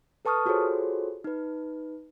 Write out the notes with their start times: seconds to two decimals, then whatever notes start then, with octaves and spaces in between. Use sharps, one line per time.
0.25 A4 B4 A5 C#6 D#6 F6
0.46 F4 F#4 G#4 A4 C5 C#5
1.24 D#4 B4